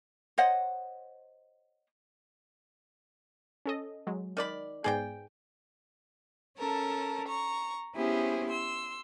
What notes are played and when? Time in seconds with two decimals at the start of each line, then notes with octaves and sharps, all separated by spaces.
0.38 C5 C#5 D#5 F#5
3.66 C#4 A4 D#5
4.07 F#3 G#3
4.37 D#3 D5 B5
4.84 G#2 B3 G#4 D5 G5 G6
6.57 C#4 A4 A#4 A5
7.27 A#5 C#6
7.96 B3 C#4 E4 G4 G#4 C5
8.49 C6 E6